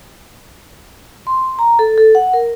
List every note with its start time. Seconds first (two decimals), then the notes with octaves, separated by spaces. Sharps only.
1.27 C6
1.59 A#5
1.79 A4
1.98 A4
2.15 F#5
2.33 A#4